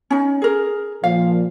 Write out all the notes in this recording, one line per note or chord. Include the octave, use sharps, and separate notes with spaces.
C#4 D#4
G#4 A#4
A#2 F3 F5